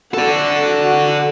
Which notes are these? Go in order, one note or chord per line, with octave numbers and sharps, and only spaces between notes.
F#4 A4 D5